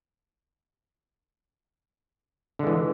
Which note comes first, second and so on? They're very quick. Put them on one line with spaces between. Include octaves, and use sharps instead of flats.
D3 G#3 E3